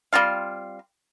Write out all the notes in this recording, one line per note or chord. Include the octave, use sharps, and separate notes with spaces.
G3 C4 F4 F5